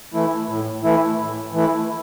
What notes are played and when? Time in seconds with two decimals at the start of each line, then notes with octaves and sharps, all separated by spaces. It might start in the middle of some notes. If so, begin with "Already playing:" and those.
0.14 E3 A3 E4
0.48 A2
0.84 E3 A3 E4
1.18 A2
1.52 E3 A3 E4